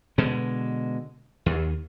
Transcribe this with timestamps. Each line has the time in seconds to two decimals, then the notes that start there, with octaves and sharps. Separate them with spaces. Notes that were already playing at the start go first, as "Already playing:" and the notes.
0.18 B2 D3 G#3
1.46 D#2